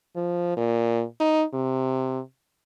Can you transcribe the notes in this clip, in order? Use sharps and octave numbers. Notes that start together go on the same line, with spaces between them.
F3
A#2
D#4
C3